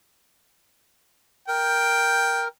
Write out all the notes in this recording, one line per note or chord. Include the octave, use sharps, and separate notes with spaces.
A#4 G5